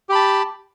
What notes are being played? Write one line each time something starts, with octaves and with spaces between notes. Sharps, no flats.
G4 A5 B5